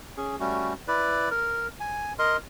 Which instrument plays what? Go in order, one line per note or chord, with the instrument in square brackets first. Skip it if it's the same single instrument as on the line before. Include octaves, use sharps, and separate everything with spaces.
[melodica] C#4 G#4
G3 A3 C#4 F#4
E4 B4 D5
A#4
G#5
A#4 D#5 C6